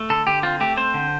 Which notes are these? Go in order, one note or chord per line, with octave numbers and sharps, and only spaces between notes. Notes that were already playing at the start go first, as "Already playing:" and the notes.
Already playing: A3
D3 A4
D3 G4
C4 F4
A3 G4
C4 C5
D3